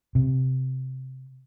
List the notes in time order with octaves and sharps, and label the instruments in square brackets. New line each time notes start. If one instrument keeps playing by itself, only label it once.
[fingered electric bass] C3